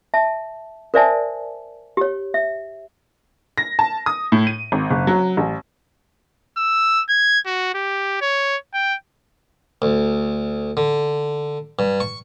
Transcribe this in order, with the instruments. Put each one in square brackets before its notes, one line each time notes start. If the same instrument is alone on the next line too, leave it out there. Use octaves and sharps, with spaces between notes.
[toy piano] E5 A5
A#4 C5 D5 E5 G#5 A5
G4 C#5
E5
[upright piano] A#6
A5
D#6
A2
D#7
G#1
F#1
F#3
A1
[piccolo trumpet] E6
G#6
F#4
G4
C#5
G5
[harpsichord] D2
D3
G2
C#6